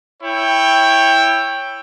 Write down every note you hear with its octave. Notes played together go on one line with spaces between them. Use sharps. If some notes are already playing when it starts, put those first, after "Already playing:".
E4 C#5 G5